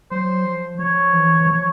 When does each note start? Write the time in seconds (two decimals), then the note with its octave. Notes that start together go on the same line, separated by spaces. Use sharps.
0.11 F#3 C5
0.45 F3
0.79 F3 C#5
1.13 E3
1.41 E3
1.47 F3